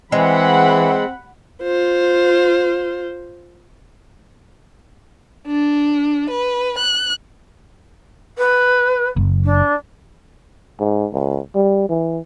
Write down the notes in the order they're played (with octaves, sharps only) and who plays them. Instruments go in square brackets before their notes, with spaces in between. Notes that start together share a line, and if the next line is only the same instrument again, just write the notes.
[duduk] E3 [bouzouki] G#3 [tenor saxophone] C4 [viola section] F#5 B5
[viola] F4 C5
[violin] D4
B4
F#6
[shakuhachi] B4
[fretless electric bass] F#1
[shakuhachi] D4
[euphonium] G#2
C#2
G3
E3